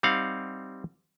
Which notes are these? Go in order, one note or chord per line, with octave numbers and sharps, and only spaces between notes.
G3 C4 D#4 F5 F#5